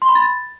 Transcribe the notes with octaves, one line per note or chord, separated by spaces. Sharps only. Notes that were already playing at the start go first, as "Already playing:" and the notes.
C6
B5
A6